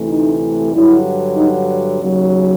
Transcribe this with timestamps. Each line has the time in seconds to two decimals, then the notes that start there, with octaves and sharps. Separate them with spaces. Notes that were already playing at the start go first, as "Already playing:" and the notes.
Already playing: D2 C3 E3 A3
0.09 D#4
0.73 G2 D3 F#3 E4
1.36 D#4
2.01 D#2 C#3 F#3